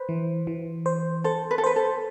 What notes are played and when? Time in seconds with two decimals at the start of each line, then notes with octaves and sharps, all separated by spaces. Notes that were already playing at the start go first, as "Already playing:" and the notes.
Already playing: B4 C5
0.09 E3
0.47 E3
0.86 C5
1.24 A4 C5
1.51 B4
1.58 A4
1.64 B4 C5
1.76 A4